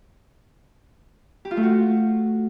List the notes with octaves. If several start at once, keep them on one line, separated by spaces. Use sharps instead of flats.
G4
F4
A3
F#4